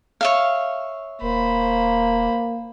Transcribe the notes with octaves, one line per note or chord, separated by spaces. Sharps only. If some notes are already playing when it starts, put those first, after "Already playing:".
C#5 E5 F5
D#1 A#3 C5 B5